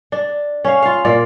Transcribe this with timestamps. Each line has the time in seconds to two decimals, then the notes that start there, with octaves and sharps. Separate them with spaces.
0.12 D4
0.65 C#4 F5
0.82 F4 F5
1.05 A#2 A#3 D5